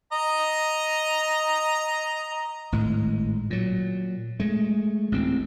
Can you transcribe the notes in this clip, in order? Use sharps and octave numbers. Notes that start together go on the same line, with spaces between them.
D#5 A#5
G#1 A2 G#3
A#2 F#3
G#3 A3
A1 D2 C4